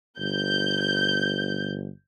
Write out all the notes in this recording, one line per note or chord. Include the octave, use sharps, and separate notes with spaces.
G1 G6